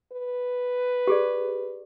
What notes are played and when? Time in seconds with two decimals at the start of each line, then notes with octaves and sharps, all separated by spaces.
0.12 B4
1.07 G4 G#4 D5